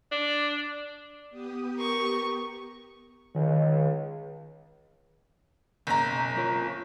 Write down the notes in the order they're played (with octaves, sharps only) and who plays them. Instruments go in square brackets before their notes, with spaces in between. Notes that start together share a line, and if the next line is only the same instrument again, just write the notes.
[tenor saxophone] D4
[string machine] B3 G4 D#6
[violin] A#4 C#6
[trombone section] C#2 [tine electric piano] D#3
[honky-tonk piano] F#1 A#5 [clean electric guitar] B1
[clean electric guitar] F4 A#4 C#5